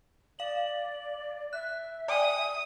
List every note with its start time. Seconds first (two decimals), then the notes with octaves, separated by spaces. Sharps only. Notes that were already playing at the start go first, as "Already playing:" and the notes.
0.39 D5 F5 F#7
1.53 E5 F#6
2.08 D5 G5 G#5 D#6